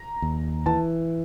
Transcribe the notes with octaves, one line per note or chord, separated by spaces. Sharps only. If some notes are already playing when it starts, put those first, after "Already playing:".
Already playing: A#5
D#2
E3 A5